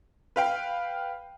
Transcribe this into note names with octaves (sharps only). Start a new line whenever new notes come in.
B4 F5 G5